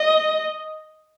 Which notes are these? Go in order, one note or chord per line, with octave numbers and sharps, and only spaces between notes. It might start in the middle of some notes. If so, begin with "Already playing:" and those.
Already playing: D#5